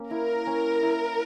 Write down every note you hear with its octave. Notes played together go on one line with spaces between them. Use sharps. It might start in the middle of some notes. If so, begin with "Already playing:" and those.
Already playing: A#3 C#4
E4 A#4
C#4
E4